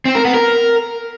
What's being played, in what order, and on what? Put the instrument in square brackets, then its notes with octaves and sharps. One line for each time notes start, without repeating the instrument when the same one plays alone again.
[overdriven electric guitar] C4
A#4
B3
A#4